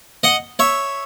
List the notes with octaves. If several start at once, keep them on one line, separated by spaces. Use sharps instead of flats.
D#5 F#5
C#5 E5